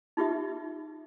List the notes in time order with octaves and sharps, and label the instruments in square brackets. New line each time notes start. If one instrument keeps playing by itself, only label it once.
[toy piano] D#4 F4 G4 E5